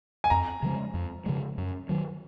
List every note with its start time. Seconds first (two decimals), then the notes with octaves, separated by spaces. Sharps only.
0.24 G#5
0.30 F2 A#5
0.62 C#3 F3 G#3
0.94 F2
1.26 C#3 F3 G#3
1.58 F#2
1.89 D#3 F#3